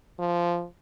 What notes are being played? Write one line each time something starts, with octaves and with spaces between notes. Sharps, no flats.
F3